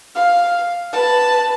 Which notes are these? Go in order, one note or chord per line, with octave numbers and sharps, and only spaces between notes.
F5
B4 A5